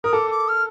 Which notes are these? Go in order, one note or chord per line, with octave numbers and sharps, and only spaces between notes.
A#4 D#6
A4 D6
D6
F6